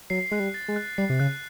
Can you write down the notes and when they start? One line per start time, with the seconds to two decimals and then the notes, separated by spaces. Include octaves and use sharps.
0.10 F#3 C7
0.31 G#3 F#6
0.40 G3
0.54 A6
0.68 G#3
0.76 F#6
0.98 G3 C7
1.10 C3
1.20 C#3 F#6